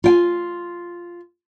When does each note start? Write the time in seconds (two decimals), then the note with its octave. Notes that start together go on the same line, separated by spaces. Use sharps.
0.04 F4 G5 G#5